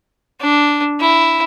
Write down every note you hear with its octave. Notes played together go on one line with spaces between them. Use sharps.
D4
E4